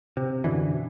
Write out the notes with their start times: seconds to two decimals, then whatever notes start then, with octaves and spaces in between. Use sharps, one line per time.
0.17 C3
0.44 F#2 B2 D3 E3